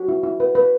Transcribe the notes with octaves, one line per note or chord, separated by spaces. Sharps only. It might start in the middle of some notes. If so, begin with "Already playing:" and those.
Already playing: F#4
E4
E4
B4
B4